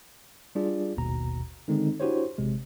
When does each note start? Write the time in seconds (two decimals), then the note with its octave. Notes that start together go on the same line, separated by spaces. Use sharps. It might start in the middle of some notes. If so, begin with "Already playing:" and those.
0.55 G3 D4 F4 G#4 D5
0.97 G#1 D#2 B2 A#5
1.68 D3 D#3 G#3 C4 D#4
2.00 D4 E4 F#4 G4 C5 C#5
2.38 A1 C3 G#3